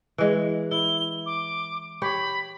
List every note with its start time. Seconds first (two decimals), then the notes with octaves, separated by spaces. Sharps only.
0.18 E3 G#3
0.71 E4 G7
1.26 D6
2.02 G4 C#5 B5